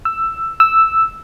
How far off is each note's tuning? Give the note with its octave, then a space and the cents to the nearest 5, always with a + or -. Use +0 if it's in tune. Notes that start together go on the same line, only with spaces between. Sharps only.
E6 +10
E6 +0